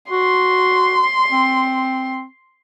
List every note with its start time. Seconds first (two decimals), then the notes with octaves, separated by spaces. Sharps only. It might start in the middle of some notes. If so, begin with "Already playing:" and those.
0.11 F#4 C6
1.32 C4